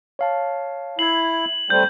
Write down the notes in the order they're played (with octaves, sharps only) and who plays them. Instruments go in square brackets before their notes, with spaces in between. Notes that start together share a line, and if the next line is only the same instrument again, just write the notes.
[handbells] C#5 F5 A5
[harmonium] E4 [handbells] G#6 C7 [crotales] F#7
[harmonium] G3 A3 C4 [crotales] G6